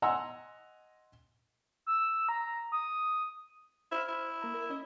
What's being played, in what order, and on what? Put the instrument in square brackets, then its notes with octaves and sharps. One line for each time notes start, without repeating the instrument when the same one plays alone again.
[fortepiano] D#5 F#5 G#5 A#5 C6 E6
[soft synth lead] E6
A#5
D#6
[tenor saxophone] E4 [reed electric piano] C5 C6 F6
[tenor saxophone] E4
[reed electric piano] A#3 A#5
A#4
C#4 D#5